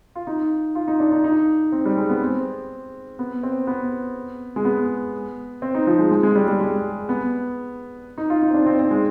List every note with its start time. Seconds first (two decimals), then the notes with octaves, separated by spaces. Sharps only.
0.15 F4
0.27 D#4
0.75 F4
0.88 D#4
1.00 D4
1.12 D#4
1.24 D#4
1.72 C4
1.86 G3
1.97 G#3
2.09 B3
2.22 C4
3.19 B3
3.43 C4
3.67 B3
4.56 G#3
4.65 B3
5.62 C4
5.75 D#4
5.87 F3
5.98 G#3
6.11 G#3
6.23 G#3
6.35 G3
6.48 G3
6.60 G#3
7.09 B3
8.18 D#4
8.30 F4
8.42 D#4
8.51 C4
8.54 D4
8.66 C4
8.79 C4
8.91 G#3